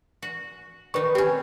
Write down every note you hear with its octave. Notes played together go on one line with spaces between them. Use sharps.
F#4
D#3 D#4 B4 C#6
C4 C#4 G4